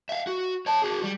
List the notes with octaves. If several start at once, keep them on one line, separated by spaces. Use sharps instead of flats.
E5 F5
F#4
C#5 A5
F#4 G#4
G3